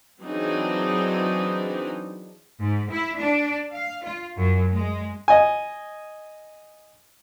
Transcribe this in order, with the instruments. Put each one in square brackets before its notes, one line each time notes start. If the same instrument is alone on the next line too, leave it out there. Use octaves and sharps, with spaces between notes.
[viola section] E3 F#3 C4 D4 D#4 G#4
[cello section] G#2
E4
D4
F5
F4
F#2
G#3
[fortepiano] D#5 G#5